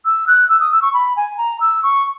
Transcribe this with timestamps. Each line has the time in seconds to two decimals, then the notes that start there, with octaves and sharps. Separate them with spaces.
0.05 E6
0.27 F#6
0.49 E6
0.61 D#6
0.72 E6
0.82 C#6
0.93 B5
1.17 G#5
1.38 A#5
1.60 E6
1.83 C#6